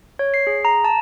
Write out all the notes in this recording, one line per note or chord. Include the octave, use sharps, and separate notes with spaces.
C#5
C7
G#4
A#5
A5